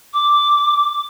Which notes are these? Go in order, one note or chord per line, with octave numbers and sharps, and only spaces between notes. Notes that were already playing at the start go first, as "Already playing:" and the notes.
D6